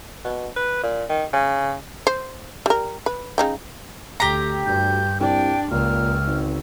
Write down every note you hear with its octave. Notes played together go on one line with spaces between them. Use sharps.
B2
B4
A#2
D#3
C#3
C5
G3 A#4
B4
C#3 D#4 G5
D2 G4 A#5
D2 G2 G6
C2 D4 G5
C#2 A#2 F6
G#1